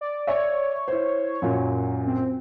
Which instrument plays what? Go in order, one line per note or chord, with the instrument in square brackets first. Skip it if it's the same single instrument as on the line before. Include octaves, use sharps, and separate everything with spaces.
[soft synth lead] D5
[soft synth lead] C#5 [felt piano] D5 E5
[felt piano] E4 C5
F#2 A#2 F#3
[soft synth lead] C4